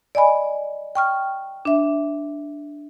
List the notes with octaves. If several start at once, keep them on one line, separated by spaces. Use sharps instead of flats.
D5 D#5 G#5 B5
G5 C#6 F6
D4 E5